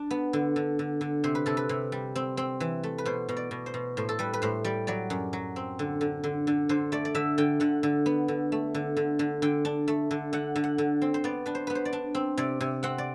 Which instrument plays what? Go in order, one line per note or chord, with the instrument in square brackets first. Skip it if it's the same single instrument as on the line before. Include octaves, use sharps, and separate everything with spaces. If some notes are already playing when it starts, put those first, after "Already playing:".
Already playing: [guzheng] D4
B3
D3
D3
D3
D3
C3 C5
B4
C3 A4
B4
C3
G3
C4
C4
E3
A3
B4
B2 C5
B2
D5
B2
C5
B2
A2 C5
A4
G3 B4
B4
A2 C5
G3 D5
F#3 D5
F#2
F#3
C4
D3
D3
D3
D3
D3 C5
A3 D5
D5
D3 E5
D3 G5
D3 F#5
D3
B3
D3
A3
D3
D3
D3
D3 G5
D4
A3
D3
D3 F#5
D3
F#5
D3
C4
C5
B3 D5
D4 B4
C5
B3 B4
C5
D5
D4
C4
C3 D5
C3
C4 F#5
D5